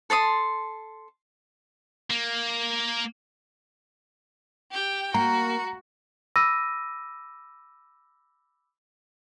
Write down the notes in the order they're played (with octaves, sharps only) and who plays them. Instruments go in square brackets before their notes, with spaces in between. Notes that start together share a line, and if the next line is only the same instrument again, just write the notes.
[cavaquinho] A4 A5 C6 D#6
[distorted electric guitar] A#3
[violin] G4 G5
[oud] A#3 [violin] F#4 [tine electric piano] A#5
[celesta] B5 D6 E6 A#6 D#7